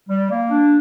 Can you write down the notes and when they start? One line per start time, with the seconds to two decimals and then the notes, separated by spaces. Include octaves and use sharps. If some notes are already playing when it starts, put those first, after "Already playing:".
0.09 G3
0.30 A#3
0.51 D4